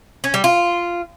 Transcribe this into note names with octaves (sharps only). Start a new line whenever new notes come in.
C#4
G3
F4